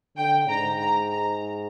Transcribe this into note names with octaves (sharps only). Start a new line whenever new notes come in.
D3 G5
G#2 A#5
A#5
A#5